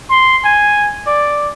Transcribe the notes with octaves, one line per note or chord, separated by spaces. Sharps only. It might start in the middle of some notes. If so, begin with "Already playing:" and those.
C6
G#5
D5